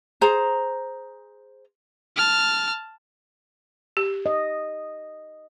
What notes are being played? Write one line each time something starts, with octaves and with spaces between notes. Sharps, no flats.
G#4 C5 A#5
A5 F6
G4
D#5